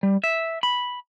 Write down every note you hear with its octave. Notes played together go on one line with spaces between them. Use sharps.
G3
E5
B5